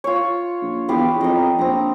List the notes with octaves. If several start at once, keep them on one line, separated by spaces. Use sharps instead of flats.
F4 C#5
A#1
E2 B3 G4 F5
F2 D#4 D#5
A#1 C4 A#5